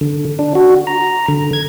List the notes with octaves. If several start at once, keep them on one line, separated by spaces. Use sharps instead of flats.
D3
D4
F#4
A#5
D3
G#6